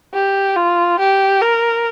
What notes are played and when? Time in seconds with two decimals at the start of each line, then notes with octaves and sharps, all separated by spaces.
0.14 G4
0.56 F4
0.99 G4
1.41 A#4